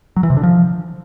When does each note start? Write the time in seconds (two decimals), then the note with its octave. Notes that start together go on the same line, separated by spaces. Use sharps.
0.16 F#3
0.23 E3
0.30 C3
0.37 D3
0.43 F3